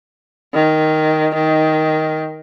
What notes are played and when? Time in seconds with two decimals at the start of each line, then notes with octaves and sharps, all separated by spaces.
0.54 D#3
1.35 D#3